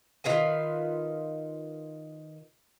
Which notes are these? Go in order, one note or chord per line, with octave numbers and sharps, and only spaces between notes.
D#3 F4 B4 G#5